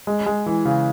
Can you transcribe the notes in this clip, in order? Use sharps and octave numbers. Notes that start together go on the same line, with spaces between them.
G#3
G#3
E3
C#3